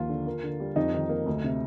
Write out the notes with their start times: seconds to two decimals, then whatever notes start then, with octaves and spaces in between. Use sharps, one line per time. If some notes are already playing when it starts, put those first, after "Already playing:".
Already playing: D#2 F3 F4
0.09 D3
0.27 A#3
0.43 D3
0.60 G3
0.76 F2 D#4
0.94 D#3
1.09 A#3
1.26 D2
1.44 C3